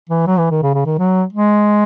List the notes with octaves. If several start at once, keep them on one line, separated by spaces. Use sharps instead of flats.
E3
F#3
E3
D#3
C#3
C#3
D#3
F#3
G#3